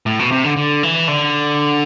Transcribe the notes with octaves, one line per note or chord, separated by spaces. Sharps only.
A2
B2
C3
D3
D3
E3
D3